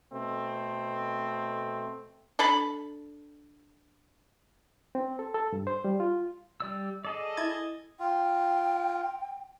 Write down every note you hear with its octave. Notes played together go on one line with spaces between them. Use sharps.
B2 A3 C4
D4 A4 A5 B5
C4
A4
A4
G2
C5
G3
F4
G3 D5 E6
G#4 A4 D5 D#5
E4 G#6 A6
F4 G5